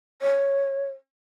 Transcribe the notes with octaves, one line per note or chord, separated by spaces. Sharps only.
C#5